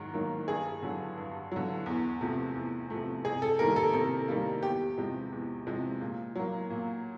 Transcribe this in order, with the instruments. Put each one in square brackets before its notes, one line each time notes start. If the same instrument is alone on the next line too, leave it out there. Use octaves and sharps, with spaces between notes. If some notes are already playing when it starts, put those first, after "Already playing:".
Already playing: [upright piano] G#2 D#3 F#3
D#3 F#3 A#3
G2 G#4
D3 F#3
G2
D3 F#3
E2
C3 F3 A3
E2
C3 F3 A3
C3 G#4
A4
D#3 G3 A#3 A#4
A4
C3 A4
D#3 G3 A#3
E2 G4
C3 F3 G#3
E2
C3 F3 G#3
A#2
F#3 A#3
A#2